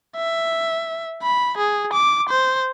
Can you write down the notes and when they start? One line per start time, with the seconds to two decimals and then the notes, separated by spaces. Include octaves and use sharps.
0.17 E5
1.23 B5
1.58 G#4
1.94 D6
2.29 C5